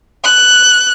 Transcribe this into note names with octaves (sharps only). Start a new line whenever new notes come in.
F#6